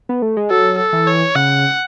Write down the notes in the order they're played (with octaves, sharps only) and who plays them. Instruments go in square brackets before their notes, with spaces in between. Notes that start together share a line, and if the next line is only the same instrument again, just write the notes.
[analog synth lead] B3
A3
G#3
[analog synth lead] F#3 [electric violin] A4
[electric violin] A4
[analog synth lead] E3
[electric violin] C#5
[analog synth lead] C#3 [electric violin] F#5